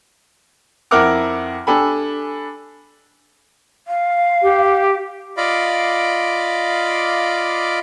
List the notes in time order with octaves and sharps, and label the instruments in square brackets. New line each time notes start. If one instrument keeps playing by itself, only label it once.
[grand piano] F2 E4 A#4 F#5 D6 F6
D4 G4 A4 G#5 B5
[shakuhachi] F5
[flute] G4
[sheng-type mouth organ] F4 D5 D#5 F5 B5 D6